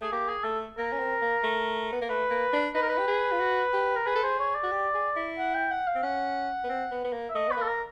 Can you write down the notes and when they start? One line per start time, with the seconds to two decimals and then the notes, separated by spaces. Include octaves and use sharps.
0.01 A3 G#4
0.12 A#3 G4
0.28 G#4
0.44 A3 A4
0.77 A#3 A#4
0.93 C#4
0.99 C4
1.22 A#3
1.43 A3
1.93 B3
2.01 A#3
2.10 A3 B4
2.30 A#3
2.53 D4
2.75 D#4 B4
2.82 A#4
2.89 B4
2.98 G4
3.08 G#4
3.32 F4
3.40 F#4
3.73 G4
3.96 A#4
4.06 G#4 B4
4.16 A4
4.23 G#4 C5
4.39 C#5
4.55 D5
4.64 F#4
4.72 G4
4.95 G#4
5.16 E4
5.38 F#5
5.54 G5
5.71 F#5
5.87 F5
5.95 C4
6.03 C#4 F#5
6.64 B3
6.69 C4
6.91 B3
7.05 B3
7.13 A#3
7.29 E5
7.35 A3 D#5
7.48 B3 B4
7.57 A#3 A4
7.68 A#4